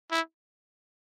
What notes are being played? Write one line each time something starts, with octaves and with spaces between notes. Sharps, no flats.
E4